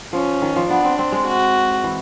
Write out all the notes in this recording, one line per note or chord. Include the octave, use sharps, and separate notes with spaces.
F3 C#4
D#3
F3
B3 D4
C4
C4
G#3
F#4
E3